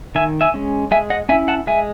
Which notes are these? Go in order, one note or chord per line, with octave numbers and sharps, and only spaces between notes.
D#3 E5 G#5
E5 G#5
G#3 C#4
G#3 E5 G#5
D#5 F#5
C#4 E4 E5 G#5
F#5 A5
G#3 E5 G#5